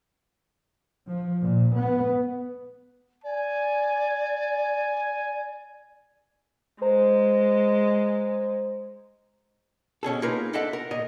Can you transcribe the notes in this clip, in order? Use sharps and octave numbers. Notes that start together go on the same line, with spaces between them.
F3
A#2
B3
D5 G#5
G#3 C5 A#5
B2 C#4 G#4 A4
A#3 D#4 F4 G#4 A#4 B4
D4 A4 D#5 E5 F#5
A#4
A#2 A#4 D#5